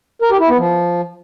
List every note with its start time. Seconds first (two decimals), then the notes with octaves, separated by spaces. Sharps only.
0.22 A#4
0.31 G4
0.40 E4
0.49 B3
0.58 F3